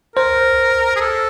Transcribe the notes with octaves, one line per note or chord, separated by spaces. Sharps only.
A#4 C5
G#4
A4